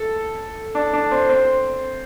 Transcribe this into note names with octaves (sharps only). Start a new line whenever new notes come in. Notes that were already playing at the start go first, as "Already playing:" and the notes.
Already playing: A4
D4
D4
C4
C4